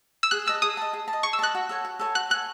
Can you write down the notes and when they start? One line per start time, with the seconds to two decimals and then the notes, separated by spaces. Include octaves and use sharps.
0.23 E6
0.31 G#4 F#6
0.46 D#5 A5 E6
0.62 G#4 D#6
0.77 D#5 A5
0.93 G#4
1.08 A5
1.13 D#5
1.23 G#4 C#6
1.33 E6
1.39 D#5 A5 F#6
1.55 F#4
1.69 A4 C#5 G#5
1.85 F#4
1.99 A4 C#5 G#5
2.15 F#4 F#6
2.30 A4 C#5 G#5 F#6